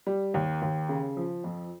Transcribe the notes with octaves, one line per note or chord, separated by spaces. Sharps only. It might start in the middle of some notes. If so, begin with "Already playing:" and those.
G3
D#2
D#2
C#3
F3
F2